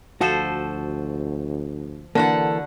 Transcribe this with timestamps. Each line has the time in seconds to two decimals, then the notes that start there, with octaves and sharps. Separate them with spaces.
0.21 D2 F3 F#4 A4 C5
2.15 D3 E3 A#3 F#4 A4 F#5